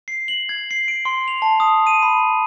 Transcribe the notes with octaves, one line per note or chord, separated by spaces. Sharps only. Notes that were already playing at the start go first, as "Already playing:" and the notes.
C7
F#7
G#6
C7
D7
C6
F7
A5
D#6
D#7
B5